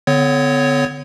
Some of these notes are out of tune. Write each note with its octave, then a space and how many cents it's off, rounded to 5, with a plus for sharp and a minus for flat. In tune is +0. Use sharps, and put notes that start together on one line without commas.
D3 -15 B3 +35 C#5 +0